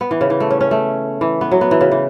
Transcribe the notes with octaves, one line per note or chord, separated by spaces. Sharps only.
B3
E3
C#3
E3
A3
C#4
C#4
A3
E3
B3
F#3
B3
E3
C#3
E3